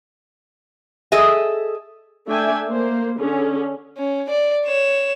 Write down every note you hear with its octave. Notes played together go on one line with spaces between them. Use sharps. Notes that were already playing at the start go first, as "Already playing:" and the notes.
G#4 A4 D#5 E5
A3 D4 E5 G5 G#5
A#3 C5
D3 C#4 G#4
C#4
D5
C#5 E7